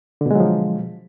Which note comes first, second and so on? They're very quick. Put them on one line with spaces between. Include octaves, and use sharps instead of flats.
D3 B2 G#3 F#3 F3